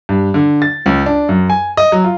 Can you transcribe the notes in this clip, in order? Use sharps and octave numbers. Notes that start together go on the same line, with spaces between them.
G2
D3
A6
C#2
D4
F#2
G#5
D#5
F#3
F4